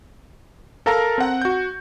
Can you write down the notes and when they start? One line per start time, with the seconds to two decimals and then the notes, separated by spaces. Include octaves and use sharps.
0.86 A4 A#4 F5 A5 A#5
1.18 C4 F#5
1.42 F#4 G6